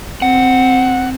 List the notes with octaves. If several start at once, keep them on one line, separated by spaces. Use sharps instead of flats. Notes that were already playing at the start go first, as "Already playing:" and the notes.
C4 F#5